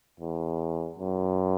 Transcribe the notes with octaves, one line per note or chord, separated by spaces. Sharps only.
E2
F#2